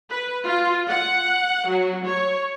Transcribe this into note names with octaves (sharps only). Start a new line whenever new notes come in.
B4
F4
F#5
F#3
C#5